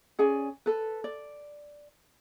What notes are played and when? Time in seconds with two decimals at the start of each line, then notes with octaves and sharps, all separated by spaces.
0.19 C#4 G#4 D5 G#5
0.66 A4 B4
1.04 D5